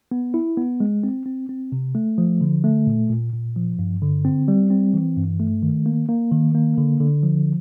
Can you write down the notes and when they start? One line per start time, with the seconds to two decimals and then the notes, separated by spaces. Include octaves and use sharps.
0.11 B3
0.34 E4
0.57 B3
0.80 G#3
1.03 C4
1.26 C4
1.49 C4
1.72 C3
1.95 A3
2.18 F3
2.41 D3
2.64 A3
2.87 A#2
3.10 A#2
3.33 A#2
3.56 F3
3.79 G2
4.02 D3
4.25 C4
4.48 G3
4.70 C4
4.94 E3
5.17 G2
5.40 A3
5.63 D#3
5.86 A#3
6.09 A#3
6.32 D#3
6.55 A#3
6.78 D3
7.00 D3
7.23 F3